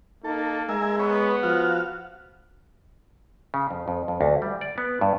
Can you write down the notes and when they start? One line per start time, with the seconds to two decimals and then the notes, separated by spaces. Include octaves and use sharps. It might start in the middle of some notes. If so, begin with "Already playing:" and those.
0.24 A#3 D#4 A4
0.69 G#3 A#4 E5 G#5
1.00 B3 B4 C#5
1.43 F3 F#4 F5
3.54 C#3
3.71 F2
3.88 F2
4.08 F2
4.21 D2
4.42 G3
4.61 D5
4.78 B3
5.01 G2